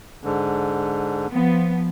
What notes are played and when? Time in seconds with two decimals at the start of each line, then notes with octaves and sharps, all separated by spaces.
0.24 G#2 D3
1.31 F3 B3